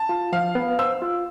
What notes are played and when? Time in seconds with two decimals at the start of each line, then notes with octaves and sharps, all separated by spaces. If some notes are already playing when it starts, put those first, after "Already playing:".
Already playing: A5
0.09 F4
0.33 F3 F5
0.55 B3
0.79 C5 E6
1.02 F4